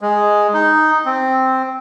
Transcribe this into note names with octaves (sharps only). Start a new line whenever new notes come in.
G#3
D#4
C4